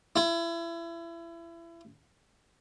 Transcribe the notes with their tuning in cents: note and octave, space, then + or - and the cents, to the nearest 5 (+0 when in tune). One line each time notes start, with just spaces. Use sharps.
E4 +30